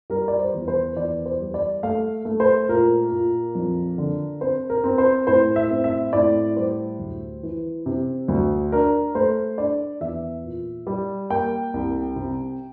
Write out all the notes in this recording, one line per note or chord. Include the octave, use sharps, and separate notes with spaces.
G3 A#4
D5
C5
E2
C5
E2 D5
C5
G3
D5
A3 F5
A3
C5
A#2 A#4
A#2
F2
D3
C4 C5
A#4
C4
C5
A2 C5
E5
C4
E5
A2 D5
G3 C5
D2
E3
C3
D2
D4 A#4
A3 C5
D4 D5
E2 E5
A#2
G3
A#3 G5
C2
C3